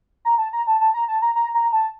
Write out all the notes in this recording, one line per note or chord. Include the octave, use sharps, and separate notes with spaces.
A#5
A5
A#5
A5
A5
A#5
A5
A#5
A#5
A#5
A5